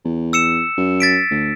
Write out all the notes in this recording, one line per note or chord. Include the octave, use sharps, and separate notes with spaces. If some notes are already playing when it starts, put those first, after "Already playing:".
E2
E6 C#7 E7
F#2
A6 B6 D7
D2